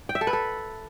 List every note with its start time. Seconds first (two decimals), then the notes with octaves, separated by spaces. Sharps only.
0.09 G5
0.15 E5
0.21 A4
0.27 B4
0.33 A4